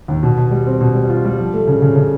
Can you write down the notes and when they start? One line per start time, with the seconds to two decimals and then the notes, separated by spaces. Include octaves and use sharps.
0.08 D#2
0.23 B2
0.37 B2
0.51 G3
0.67 C4
0.81 B2
0.95 G3
1.10 F4
1.25 G3
1.38 F3
1.53 A3
1.67 C#3
1.82 C#3
1.96 C#3